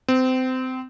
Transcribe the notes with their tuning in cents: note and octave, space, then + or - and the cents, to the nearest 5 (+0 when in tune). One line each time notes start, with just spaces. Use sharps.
C4 -25